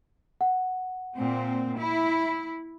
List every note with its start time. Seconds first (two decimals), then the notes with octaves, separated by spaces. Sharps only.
0.41 F#5
1.16 A#2 C4
1.77 E4